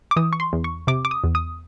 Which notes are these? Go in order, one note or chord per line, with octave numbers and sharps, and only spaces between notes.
D6
E3 D#6
C#6
C6
E2
C#6
C3 D6
D6
D#6
E2
D#6